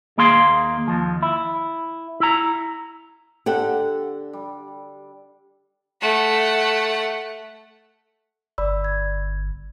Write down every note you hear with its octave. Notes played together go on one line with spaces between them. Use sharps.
D#2 A#3 G#4 F5 C6
D#2 F3
E4
E4 A#5
D3 G4 A4 F#5
G3
A3 F#5
G1 D5 B5 E6
G#6